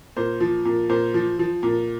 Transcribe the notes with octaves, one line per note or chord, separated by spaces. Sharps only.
A#2 C5
F3
A#2
A#2 C5
F3
F3
A#2